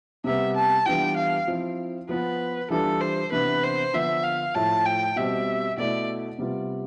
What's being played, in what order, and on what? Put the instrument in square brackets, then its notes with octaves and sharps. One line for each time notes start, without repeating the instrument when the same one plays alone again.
[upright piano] C3 G3 B3 [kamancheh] E5
[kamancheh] A5
[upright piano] E3 G3 B3 D4 F4 [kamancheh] G5
[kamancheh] F5
[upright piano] F3 C4 E4
[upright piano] F3 B3 F4 [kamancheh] B4
[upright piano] E3 G3 D4 F4 [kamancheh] A4
[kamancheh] C5
[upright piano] C3 E3 B3 D4 [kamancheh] B4
[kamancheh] C5
[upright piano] D3 F3 B3 D4 [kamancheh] E5
[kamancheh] F5
[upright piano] A2 F3 A3 E4 [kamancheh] A5
[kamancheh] G5
[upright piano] B2 G3 C4 [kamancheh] E5
[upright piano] B2 A3 E4 [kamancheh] D5
[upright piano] C3 G3 B3 F4